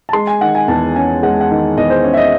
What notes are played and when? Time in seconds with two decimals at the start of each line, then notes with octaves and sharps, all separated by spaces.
0.09 A5
0.13 G#3 C6
0.27 G#5
0.41 D#3 F#5
0.55 G#5
0.68 E2 A5
0.96 C#4 G#5
1.23 G#3 F#5
1.41 F#5
1.50 D#3
1.77 E2 D#5
1.90 C5
2.04 C#4 C#5
2.14 E5
2.17 D#5